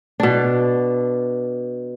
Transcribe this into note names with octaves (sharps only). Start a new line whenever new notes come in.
B2 D4